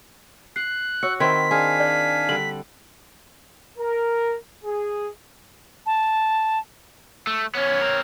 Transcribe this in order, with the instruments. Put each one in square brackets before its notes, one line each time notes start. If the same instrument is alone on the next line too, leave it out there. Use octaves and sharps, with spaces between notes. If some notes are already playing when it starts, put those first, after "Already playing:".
[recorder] F#6 [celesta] C7
[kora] F#4 [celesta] C#5 E6 C#7
[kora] D#3 C4 E4 [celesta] C5 C6 G#6 [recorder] B6
[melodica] D4 F5 G#5 [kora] G#4
[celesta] D5
[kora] D3 G3 [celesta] F#7
[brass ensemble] A#4
G#4
[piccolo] A5
[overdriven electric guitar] A3
[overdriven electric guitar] B3 C#4 [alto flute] C#5
[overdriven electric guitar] C4 A#4